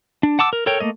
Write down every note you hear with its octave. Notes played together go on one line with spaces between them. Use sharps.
D4
F#5 A5 D6 E6
A#4
A4 A#4 C#5 G5
A3 A#3 D#5